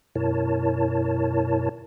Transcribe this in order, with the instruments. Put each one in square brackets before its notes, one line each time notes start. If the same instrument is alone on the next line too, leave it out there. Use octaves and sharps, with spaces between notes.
[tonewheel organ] F#2 B2 E4 A#4 C#5 A5